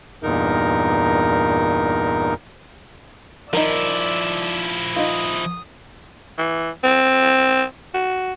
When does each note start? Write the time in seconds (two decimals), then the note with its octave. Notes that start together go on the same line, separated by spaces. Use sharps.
0.23 E2 G2 A#2 D#4 A#4
3.53 F3 D#4 E4 A#4 D5 E6
4.96 D#4 F4 D#6
6.38 E3
6.84 C4
7.94 F#4